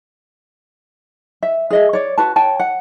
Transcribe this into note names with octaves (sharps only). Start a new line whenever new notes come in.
E5
G#4 D#5 E5
C#5 D5
F#4 B4 A5
C#5 G5 A5
F#5